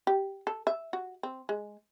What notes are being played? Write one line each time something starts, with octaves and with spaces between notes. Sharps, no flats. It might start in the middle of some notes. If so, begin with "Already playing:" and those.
G4
A4
E5
F#4
C4
G#3